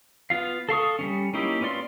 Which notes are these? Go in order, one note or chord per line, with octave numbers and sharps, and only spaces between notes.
B3 F4 F5
A4 F5 C#6 D#6
G3 A3 C#4
A#3 C#4 D#4 E4 G4
B3 C#4 F4 D5 C6